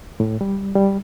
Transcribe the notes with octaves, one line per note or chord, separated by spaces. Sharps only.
A2
G3
G3